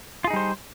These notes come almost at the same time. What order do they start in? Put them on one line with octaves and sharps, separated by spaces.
F4 G#4 D#4 G3 C5